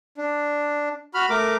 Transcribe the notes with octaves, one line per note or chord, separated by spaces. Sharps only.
D4
F#4 B5 F6
A3 A#4 D6